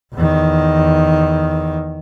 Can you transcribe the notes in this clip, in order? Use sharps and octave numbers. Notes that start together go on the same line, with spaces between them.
E2 D#3